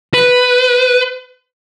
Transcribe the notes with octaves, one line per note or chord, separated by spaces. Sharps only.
B4